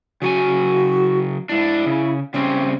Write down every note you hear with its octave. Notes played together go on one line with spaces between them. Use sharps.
C#3 F#3 F#4 G#5
G#2 D4 E4
C#3
C#3 G3 C4 C#4